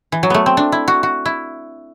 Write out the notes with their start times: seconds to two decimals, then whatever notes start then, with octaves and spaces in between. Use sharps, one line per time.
0.12 E3
0.23 F#3
0.30 A3 B3
0.46 C4
0.57 D4
0.72 E4
0.88 F#4
1.03 F#4
1.25 E4